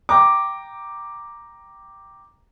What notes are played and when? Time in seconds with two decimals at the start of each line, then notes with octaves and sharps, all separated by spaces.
0.09 G5 A#5 D6